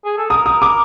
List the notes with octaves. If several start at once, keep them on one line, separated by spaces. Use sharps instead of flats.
G#4
A4
A#4 D#6
D#6
D6